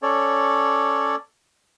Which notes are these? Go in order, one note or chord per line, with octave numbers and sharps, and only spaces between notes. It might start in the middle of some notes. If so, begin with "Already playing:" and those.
C#4 A4 C#5 D5